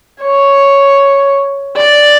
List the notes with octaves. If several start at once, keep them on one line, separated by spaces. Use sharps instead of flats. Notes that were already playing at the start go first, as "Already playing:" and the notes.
C#5
D5